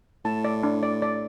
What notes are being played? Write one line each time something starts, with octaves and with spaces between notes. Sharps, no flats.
A2 A5
D5
D4
D5
D5